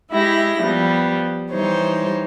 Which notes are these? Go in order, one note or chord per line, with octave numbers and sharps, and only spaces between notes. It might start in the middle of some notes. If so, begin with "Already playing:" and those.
G#3 E4 G4 A#6
F3 G3 B3
E3 G3 D#4 C5 C#5